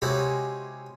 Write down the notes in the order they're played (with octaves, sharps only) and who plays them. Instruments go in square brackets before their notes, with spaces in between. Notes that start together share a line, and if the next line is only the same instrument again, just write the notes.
[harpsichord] C3 G#3 C#4 D#4 E4 F#4